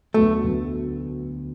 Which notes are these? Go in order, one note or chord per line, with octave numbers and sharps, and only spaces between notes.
D2 D3 F#3 A3 B3
D2 D3 F#3 B3